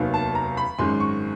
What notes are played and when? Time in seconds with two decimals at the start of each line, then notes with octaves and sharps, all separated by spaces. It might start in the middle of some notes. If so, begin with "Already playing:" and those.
Already playing: F1 D#2 D#3 F#3 B3
0.14 A5
0.35 A#5
0.57 B5
0.78 G#1 F#2 D#3 G#3 C6
1.00 C#6